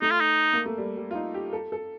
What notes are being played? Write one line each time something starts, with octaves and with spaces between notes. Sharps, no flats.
A3 D#4
F4
D#4
A#3
A3
G3
G3
F4
D#4
G4
A4
A4